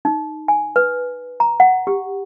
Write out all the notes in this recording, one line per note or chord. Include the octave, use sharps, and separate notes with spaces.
D#4
G#5
B4
A#5
F#5
G4